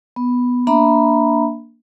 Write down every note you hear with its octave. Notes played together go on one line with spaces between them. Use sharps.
B3
A#3 D4 E5 A#5 B5